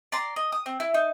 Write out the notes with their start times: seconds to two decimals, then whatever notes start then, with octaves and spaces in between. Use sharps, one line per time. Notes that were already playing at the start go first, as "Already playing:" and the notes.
0.12 D5 A#5 C6
0.36 D#5
0.52 D#6
0.66 C4
0.80 E4
0.94 D#4